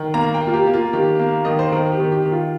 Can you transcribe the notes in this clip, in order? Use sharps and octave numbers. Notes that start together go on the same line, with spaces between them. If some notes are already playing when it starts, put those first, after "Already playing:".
Already playing: D#3
A#3 A#5
G5
A#3
F4
G4
A#3
F4
D#3 G4
A#3
D#3 D#5
C5
D#3 A#4
G4
D#3
G4
D#3
F4